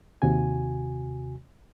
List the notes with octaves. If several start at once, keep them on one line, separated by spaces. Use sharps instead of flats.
D#2 C3 F#4 G#5